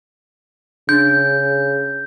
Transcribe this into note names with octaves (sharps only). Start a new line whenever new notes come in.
C#3 D4 G6 A6